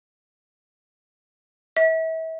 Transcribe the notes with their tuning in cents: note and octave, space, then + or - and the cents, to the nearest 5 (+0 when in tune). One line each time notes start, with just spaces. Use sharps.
E5 -35